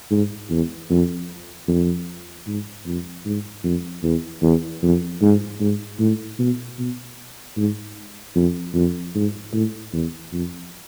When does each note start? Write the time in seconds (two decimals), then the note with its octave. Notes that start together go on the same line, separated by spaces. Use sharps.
0.11 G#2
0.50 E2
0.90 F2
1.68 F2
2.47 G#2
2.86 F2
3.25 G#2
3.64 F2
4.03 E2
4.42 E2
4.83 F2
5.21 G#2
5.60 G#2
5.99 A2
6.39 B2
6.79 B2
7.57 G#2
8.35 F2
8.74 F2
9.15 G#2
9.53 A2
9.93 E2
10.32 F2